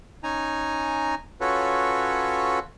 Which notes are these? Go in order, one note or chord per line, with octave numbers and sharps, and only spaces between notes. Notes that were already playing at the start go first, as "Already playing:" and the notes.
C#4 D#4 G#5 A#5
C#4 F4 F#4 A4 B4 C#5